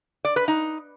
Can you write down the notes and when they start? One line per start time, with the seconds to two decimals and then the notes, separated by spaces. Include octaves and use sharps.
0.25 D5
0.36 B4
0.48 D#4